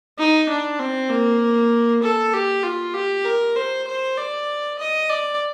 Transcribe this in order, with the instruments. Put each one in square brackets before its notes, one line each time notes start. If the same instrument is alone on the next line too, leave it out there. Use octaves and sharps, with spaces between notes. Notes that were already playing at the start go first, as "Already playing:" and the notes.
[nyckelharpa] D#4
D4
C4
A#3
A4
G4
F4
G4
A#4
C5
C5
D5
D#5
D5